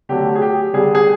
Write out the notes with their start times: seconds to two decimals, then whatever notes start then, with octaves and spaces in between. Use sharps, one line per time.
0.09 D3 F#3 A3 G4
0.35 G#4
0.42 G4
0.73 D3 G3 G#4
0.95 G#4